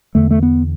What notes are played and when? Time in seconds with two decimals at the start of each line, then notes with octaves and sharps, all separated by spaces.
0.15 E2 D3 A3
0.31 A3
0.43 B3